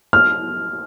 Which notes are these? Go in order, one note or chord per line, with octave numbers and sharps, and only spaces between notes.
F6